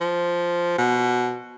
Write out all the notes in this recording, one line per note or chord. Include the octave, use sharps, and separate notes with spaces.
F3
B2